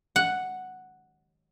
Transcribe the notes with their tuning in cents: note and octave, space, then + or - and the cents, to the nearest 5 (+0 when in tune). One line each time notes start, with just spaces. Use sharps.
F#5 +0